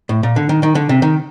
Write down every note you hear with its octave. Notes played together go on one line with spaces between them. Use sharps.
A2
A#2
D3
D#3
D#3
D3
C3
D#3